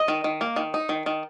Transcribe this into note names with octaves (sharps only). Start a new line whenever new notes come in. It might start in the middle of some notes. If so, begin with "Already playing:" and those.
Already playing: D#5
D#3
D#3
A#3
D#3
D#4
D#3
D#3